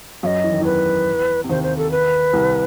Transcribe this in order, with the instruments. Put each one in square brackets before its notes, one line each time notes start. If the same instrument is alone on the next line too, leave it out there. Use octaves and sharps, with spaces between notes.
[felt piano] F#2 F#3 [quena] D#5 F5
[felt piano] E3
D#3
[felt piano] E2 E3 [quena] B4
[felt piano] C3
[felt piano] D#2 D#3 [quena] C5
[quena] C5
A4
B4
[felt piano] C2 C3